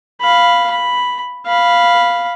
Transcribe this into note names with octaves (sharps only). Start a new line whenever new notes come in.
F5 B5
B5
F5 B5